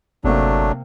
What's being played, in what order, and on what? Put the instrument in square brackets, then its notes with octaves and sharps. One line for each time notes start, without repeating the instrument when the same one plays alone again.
[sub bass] G1 [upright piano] C3 A#3 [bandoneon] F#3 A3 D4